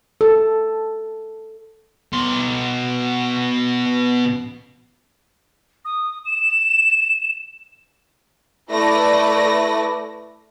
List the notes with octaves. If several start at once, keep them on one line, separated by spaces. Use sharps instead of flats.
A4
B2 C6
D#6
E7
A3 E4 B4 D5 A#6